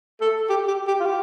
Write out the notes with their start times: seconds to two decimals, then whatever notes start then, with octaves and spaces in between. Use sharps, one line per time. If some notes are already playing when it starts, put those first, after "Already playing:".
0.21 A4
0.49 G4
0.68 G4
0.87 G4
1.00 F4
1.06 G4